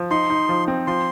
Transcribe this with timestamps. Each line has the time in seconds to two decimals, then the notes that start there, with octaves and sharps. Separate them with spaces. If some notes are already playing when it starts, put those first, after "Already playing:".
Already playing: F3
0.11 D#4 C6
0.30 D#4
0.49 F3
0.68 C4
0.87 F3 C6